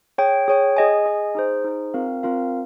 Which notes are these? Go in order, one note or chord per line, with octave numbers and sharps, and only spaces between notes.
G#4 C#5 G5
G#4 C#5 G5
G#4 D#5 G#5
G#4 D#5 G#5
D#4 G#4 C5
D#4 G#4 C5
C4 F4 A#4 F5
C4 F4 A#4 F5